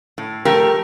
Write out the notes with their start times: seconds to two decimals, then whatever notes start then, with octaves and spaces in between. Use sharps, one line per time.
0.18 A2
0.45 F3 A3 G4 A#4